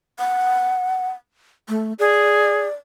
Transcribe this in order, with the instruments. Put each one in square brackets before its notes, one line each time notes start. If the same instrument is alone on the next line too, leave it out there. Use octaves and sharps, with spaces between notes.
[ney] F#5
A3
[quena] G#4 [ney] D5